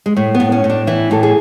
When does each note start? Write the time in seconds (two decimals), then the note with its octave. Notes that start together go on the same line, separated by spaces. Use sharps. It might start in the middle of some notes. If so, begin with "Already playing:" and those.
0.06 G#3
0.16 A2 A3
0.35 B3
0.40 A2
0.52 C#4
0.64 A2
0.70 D4
0.87 E3 E4
1.11 A2 A4
1.23 G#4